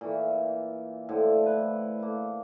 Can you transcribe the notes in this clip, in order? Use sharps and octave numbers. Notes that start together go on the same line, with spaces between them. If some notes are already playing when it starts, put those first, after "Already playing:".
A#2 E3 C#6
A2 D3 F3
B4
A#3 A5